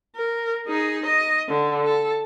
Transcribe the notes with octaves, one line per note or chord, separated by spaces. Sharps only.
A#4
D#4 G#4
D#5
D3
A4